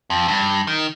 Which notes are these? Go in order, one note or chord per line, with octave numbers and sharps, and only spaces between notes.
F2
G2
D#3